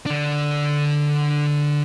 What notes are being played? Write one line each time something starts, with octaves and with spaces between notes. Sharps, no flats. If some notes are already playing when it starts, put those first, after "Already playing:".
D3 D4